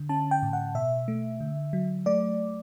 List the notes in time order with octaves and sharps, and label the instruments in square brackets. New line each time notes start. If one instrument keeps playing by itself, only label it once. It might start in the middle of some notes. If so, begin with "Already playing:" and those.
Already playing: [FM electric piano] D3
C#4 A5
G5
A2
F#5
B2 E5
A3
D3
F#3
A3 D5